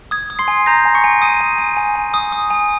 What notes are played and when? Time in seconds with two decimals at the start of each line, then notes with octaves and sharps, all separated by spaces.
0.11 D#6 G#6
0.30 D#6
0.39 C6 C7
0.48 G#5
0.66 A#5 G6 A#6
0.86 G#5
0.95 C#6 C#7
1.04 G#5
1.22 D#6 D#7
1.41 G#5
1.58 G#5
1.77 G#5
1.96 G#5
2.14 D#6
2.32 D#6
2.50 G#5